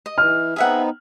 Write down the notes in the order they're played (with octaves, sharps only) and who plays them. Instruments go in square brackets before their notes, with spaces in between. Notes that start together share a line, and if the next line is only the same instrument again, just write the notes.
[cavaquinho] D#5
[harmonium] E3 [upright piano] F6
[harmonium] B3 C4 D#4 [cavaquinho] G#4 E5 F#5